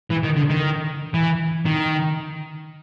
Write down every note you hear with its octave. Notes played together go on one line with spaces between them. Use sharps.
E3
D#3
D3
D#3
E3
D#3